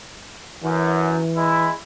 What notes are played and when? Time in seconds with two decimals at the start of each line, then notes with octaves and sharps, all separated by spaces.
0.63 F#2 E3
1.36 G#3 E4